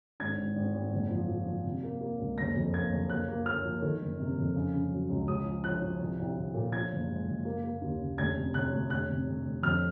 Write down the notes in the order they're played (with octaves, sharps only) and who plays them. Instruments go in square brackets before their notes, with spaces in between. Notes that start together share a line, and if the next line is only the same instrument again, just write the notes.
[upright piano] G#1 G#6
G#1
G#1
G#1
F#1
F3
F3
F3
C3
A#3
A#3
C#2
F#1 A#6
F2
A#3 G#6
F#1
A#3 F#6
A#3
A#3 F6
F3
D#3
F#1
C3
F2
C#3
C#3
F#3
C#2
C#2 D#6
F3
F3 F#6
F3
C2
C2
C2
A#2
F3 G#6
F#1
G#3
F#1
A#3
A#3
D#2
C#3
F1 G#6
C3
C3 F#6
F1
F1 F#6
C3
F1
F1
F2 F6